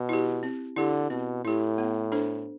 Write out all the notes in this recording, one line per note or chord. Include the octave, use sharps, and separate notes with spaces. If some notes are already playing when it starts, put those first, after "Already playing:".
Already playing: B2
E4 G4
C4
D3 E4 G4
B2 C4
A2 E4 G4
B3
D4 A4 C5